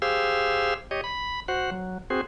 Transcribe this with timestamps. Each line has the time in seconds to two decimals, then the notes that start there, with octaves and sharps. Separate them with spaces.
0.02 G4 G#4 C5 F5 E6
0.91 G4 C#5 D#5
1.04 B5
1.48 F#4 C5 F#5
1.71 F#3
2.10 C4 F#4 G#4 C5